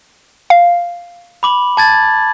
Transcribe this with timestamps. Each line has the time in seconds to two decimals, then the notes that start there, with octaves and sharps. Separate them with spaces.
0.50 F5
1.43 B5 D6 F#7
1.77 A5 G#6 A6